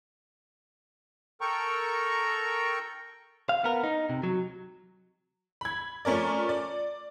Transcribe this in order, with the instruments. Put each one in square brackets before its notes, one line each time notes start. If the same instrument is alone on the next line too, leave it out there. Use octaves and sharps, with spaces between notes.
[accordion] A4 A#4 G5 A#5 C#6
[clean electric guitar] F5
B3 A#4
D#4
C3
F#3
[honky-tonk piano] B5 G#6
F3 A3 C#4 A#4 D5
D5